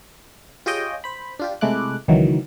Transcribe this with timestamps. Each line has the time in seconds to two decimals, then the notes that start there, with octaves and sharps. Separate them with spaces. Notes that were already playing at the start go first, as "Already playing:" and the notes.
0.66 F4 G4 G#4 C#5 D#5 G5
1.04 C5 B5
1.39 D4 F4 G4
1.61 C3 G#3 A3 E4 D6 F#6
2.08 C#2 D#3 E3 F#3